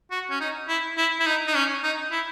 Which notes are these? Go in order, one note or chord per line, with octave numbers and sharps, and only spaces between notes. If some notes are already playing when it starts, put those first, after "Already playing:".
F#4
C#4
D#4
E4
E4
E4
D#4
D#4
C#4
D#4
E4